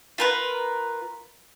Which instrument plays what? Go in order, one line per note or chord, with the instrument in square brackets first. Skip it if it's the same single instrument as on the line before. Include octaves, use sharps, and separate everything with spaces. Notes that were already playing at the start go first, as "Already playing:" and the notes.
[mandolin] F4 A#4 B4